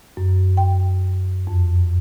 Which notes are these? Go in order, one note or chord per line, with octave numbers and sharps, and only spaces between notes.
F#2
G5
F2